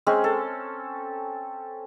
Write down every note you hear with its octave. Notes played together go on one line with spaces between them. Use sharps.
G#3 C4 C#4 G#4
A4